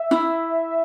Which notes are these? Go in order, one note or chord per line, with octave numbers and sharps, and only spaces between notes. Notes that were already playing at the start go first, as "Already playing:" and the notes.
Already playing: E5
E4